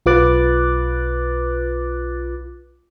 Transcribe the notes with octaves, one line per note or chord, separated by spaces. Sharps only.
B1 F4 B4 D6 F#6 A6